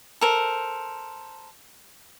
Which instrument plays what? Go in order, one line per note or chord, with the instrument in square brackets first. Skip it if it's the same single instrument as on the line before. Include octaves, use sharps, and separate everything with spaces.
[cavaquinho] A4 A#4 C5